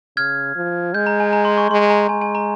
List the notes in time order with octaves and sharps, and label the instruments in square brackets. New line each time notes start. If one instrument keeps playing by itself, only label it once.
[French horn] C#3 [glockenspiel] F6 G#6
[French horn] F3
[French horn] G#3 [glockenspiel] G6
[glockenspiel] A#5
G#5
A#5
C6
C#6
[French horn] G#3 [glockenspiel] C6
[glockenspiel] A#5
[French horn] G#3 [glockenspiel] G#5
[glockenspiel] G#5
A#5